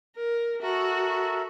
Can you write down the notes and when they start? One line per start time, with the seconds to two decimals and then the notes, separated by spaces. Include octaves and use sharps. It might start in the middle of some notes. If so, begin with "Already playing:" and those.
0.16 A#4
0.62 F#4 A4 A#4 E5